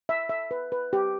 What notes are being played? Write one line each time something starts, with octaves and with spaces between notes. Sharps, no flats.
E5
E5
B4
B4
G4